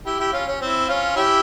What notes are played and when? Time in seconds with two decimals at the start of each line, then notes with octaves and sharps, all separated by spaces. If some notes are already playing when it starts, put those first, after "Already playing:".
0.06 E4 G4
0.19 E4 G4
0.33 C#4 F4
0.48 C#4
0.61 C4 E4
0.88 C#4 F4
1.16 E4 G4